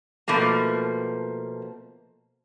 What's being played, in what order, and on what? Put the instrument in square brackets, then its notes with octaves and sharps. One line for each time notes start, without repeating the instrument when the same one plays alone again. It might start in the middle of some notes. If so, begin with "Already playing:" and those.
[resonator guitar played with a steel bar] B2 F3 A3 A#3